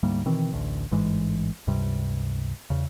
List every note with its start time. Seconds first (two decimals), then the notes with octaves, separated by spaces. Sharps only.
0.03 D2 G#2 G3 A#3
0.25 B2 D#3 E3 C4
0.53 A1 D2
0.91 A1 G#2 E3 G#3
1.67 C#2 G2 C3 G3
2.70 E2 C#3